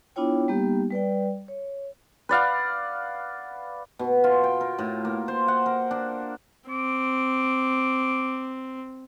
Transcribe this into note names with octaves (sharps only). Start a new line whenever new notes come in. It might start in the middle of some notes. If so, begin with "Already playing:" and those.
B3 D4 E4 F4 C#5 G5
G3 A#3 B3 D#4 G4
G3 B4 D5 G5
C#5
B4 D5 F5 F#5
B2
F4
G5
A#4
A2
A#3
C5
F#5
A#4
D4
C4 D6